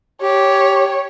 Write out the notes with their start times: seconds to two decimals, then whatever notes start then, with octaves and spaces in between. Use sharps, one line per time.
0.22 G4 C#5